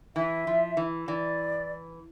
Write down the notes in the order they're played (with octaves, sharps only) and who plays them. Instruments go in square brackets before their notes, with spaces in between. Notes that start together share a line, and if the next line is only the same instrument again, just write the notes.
[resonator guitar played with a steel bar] E3 [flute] E5
[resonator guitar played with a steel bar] F3
E3
[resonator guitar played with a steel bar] E3 [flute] D5